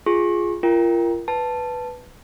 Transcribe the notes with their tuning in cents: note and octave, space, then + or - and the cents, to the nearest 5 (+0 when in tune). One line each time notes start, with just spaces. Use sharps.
F4 +0 G#4 +0 C#6 -40
F4 -30 A#4 +0 G5 +10
B4 +0 A5 +0